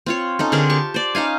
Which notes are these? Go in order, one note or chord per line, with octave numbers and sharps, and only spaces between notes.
C4 F4 C#5
C#4 D#4 A4
D3 C4 G#4 A#4
G4 A5 C#6
C5 D5
C#4 D#4 F5 G#5